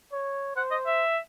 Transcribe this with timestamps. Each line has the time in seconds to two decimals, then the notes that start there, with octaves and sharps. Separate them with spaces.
0.11 C#5
0.55 C5 F#5
0.71 D#5
0.86 E5